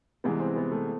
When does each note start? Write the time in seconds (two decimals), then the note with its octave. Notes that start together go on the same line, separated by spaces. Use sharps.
0.24 C2 C3 E3 G#3 B3
0.40 C4
0.56 B3
0.72 A3